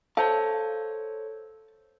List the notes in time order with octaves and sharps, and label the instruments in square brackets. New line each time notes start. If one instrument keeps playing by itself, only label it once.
[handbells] A4 C5 C#5 [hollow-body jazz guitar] F5 A5